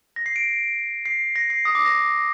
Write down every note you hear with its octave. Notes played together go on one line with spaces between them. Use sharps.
A#6
C7
D7
C7
A#6
C7
D#6
D6
A#6